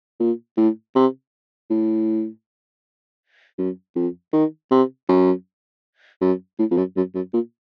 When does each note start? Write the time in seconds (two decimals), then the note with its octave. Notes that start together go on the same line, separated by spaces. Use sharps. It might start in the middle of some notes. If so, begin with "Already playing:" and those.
0.20 A#2
0.57 A2
0.95 C3
1.71 A2
3.58 F#2
3.96 F2
4.33 D#3
4.71 C3
5.09 F#2
6.21 F#2
6.59 A2
6.71 F2
6.78 F#2
6.97 F#2
7.15 F#2
7.34 A#2